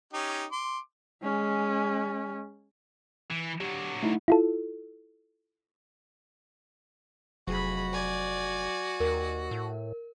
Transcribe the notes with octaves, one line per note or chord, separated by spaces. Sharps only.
C#4 D#4 G4
C6 D6
G#3 C#4
E3
D3 F#3 G4
A3 D#4 E4
E4 F4 A4
F1 F#3 F#4 G#4 B5
D5 G#5
D#2 A#4
A2